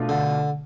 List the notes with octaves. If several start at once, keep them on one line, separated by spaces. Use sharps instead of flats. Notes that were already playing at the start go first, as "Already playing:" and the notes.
Already playing: B2 A3 D4 F4
D3